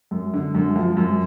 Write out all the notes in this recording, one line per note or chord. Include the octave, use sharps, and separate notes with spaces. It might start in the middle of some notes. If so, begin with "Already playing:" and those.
F#2
D3
F#2
F3
F#2